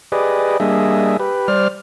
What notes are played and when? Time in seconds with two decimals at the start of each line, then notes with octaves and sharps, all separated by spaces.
0.12 G4 G#4 B4 D5 D#5
0.60 G3 A#3 D4 G#4 D#5 E5
1.20 G4 B4
1.48 G3 C5 D5 F6